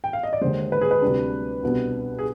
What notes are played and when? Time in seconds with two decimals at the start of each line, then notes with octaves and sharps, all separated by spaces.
0.04 G5
0.13 F5
0.23 D#5
0.33 D5
0.41 D#2 D3 G#3 C5
0.72 B4
0.81 G#4
0.91 B4
1.02 D2 C3 G3 D4
1.63 C2 B2 B3 D4
2.19 G#4